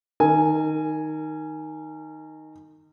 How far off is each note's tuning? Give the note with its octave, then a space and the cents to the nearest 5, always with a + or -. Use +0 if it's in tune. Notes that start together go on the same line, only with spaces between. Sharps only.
D#3 +0 A#4 -35 G#5 +0